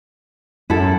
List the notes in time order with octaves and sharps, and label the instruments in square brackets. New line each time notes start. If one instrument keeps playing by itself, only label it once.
[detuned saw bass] F#2 [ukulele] E4 A4